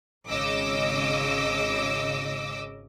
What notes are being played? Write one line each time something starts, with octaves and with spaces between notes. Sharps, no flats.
G#1 C#3 D#5 D6 E6